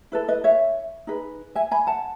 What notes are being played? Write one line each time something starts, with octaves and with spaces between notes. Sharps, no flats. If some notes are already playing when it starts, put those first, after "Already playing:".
E4 A4 B4
B4 D#5
C#5 E5
D#4 G#4 B4
E5 G#5
G#5 B5
F#5 A5